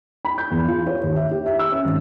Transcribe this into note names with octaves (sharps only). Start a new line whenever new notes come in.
B5
G6
E2
F4
C#5
D#2
E5
G4
E5
E6
C#4
G#1